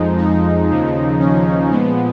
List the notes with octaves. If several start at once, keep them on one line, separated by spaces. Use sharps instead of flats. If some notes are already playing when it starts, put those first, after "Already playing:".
Already playing: F2 F3 G#3 D#4
D#4
D#2 C#3 F3
C#4
A#2 F3 G#3 B3